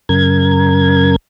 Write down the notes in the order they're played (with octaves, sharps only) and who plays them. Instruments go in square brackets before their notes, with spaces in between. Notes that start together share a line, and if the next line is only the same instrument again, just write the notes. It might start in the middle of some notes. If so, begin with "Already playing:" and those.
[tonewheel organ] F#2 C#3 A#4 G#6